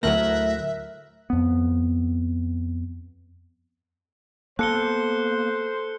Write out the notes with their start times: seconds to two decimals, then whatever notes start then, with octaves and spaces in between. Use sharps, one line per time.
0.03 D2 A2 F#3 A#4 E5 F#6 A#6
1.30 F2 B3
4.59 A#3 B3 A4 C5 F#6 C#7 G7